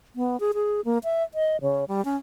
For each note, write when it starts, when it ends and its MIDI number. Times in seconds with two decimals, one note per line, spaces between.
0.16 0.39 59
0.40 0.52 68
0.54 0.81 68
0.85 0.98 58
1.04 1.23 76
1.34 1.57 75
1.62 1.84 49
1.88 2.04 55
2.05 2.16 61